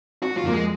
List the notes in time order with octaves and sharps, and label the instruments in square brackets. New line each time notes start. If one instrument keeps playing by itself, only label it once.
[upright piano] C4 [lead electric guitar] F#4
[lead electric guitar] F4
[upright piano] F2 [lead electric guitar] A#3
[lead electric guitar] G#3